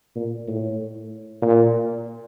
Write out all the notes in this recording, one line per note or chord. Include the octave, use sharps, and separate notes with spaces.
A#2
A2
A#2